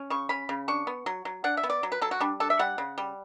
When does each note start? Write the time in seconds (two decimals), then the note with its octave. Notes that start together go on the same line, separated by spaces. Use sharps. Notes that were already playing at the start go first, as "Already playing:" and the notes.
Already playing: C#4
0.10 C#3 C#6
0.29 C#4 B5
0.49 C#3
0.68 D4 C#6
0.87 B3
1.06 F#3
1.25 F#3
1.44 D4 F#5
1.57 E5
1.63 B3
1.70 D5
1.83 F#3
1.92 B4
2.01 F#3 A4
2.11 F#4
2.20 G3 D4
2.40 D4 A4
2.50 E5
2.59 G3 F#5
2.78 C#3
2.98 G3